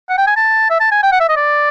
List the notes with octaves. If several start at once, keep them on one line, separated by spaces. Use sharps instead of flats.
F#5
G5
G#5
A5
E5
A5
G#5
G5
F#5
E5
D#5
D5